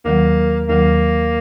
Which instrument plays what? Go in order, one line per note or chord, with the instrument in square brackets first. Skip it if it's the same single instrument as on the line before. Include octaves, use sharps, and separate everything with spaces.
[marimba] D#2 D#3 F#3 [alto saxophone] A#3
[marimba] D#2 D#3 F#3 [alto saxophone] A#3